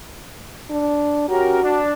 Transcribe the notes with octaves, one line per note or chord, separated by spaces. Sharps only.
D4
C#4 F#4 G4 A#4
D4